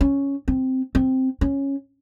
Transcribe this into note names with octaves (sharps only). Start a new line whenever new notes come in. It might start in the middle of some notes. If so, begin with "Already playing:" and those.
C#4
C4
C4
C#4